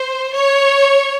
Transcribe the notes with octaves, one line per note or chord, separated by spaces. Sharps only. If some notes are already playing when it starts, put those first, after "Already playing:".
Already playing: C5
C#5